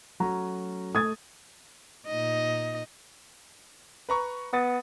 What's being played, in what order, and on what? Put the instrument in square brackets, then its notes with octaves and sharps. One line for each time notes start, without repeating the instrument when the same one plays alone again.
[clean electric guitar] F#3 A3 C#4 [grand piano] F#4 A#5
[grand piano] A3 [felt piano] D#6 G#6 A6
[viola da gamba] A#2 D#4 D#5
[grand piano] B4 A#5 C#6
[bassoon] B3 [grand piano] D#6 A6